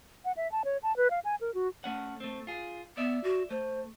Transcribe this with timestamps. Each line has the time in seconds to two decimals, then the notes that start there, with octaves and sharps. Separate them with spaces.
0.25 F#5
0.37 E5
0.52 A5
0.65 C#5
0.83 A5
0.97 B4
1.10 F5
1.25 G#5
1.41 A#4
1.54 F#4
1.84 A3 C#4 F#5
2.20 A3 C4
2.47 F4 G#4
2.97 B3 D5 E5
3.24 F#4
3.50 A3 C5